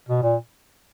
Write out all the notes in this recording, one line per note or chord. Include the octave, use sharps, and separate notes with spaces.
B2
A#2